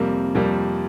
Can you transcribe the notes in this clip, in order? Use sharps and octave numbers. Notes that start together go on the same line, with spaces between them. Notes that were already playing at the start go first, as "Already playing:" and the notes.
Already playing: F2 C3 G3 A#3
F2 C3 G3 A#3